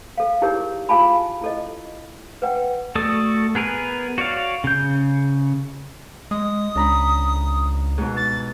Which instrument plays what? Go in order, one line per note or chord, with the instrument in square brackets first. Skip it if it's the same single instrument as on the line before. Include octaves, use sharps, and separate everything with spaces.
[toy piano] A4 F5
D#4 E4 G4 G#4 A#4 C#5
F4 G#4 F5 G#5 A5 B5
E4 A4 D#5
B4 F#5 G5
[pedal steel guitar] A3 F#4 A4 D5 D#6
B3 G#4 A#4 B4 G#5
F#4 C#5 D5 F5
C#3 G6
[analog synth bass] G#3 [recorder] D#6
[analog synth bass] C#2 [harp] D4 A#5 B5
[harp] G#2 B2
[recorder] A6